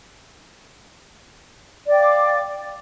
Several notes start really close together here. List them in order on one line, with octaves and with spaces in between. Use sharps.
D5 G5 F5 D6